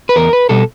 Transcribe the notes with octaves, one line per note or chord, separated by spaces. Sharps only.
B4
E2 A#4
B4
B2 G3 A4